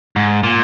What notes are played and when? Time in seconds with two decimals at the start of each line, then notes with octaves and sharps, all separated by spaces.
0.16 G#2
0.43 A#2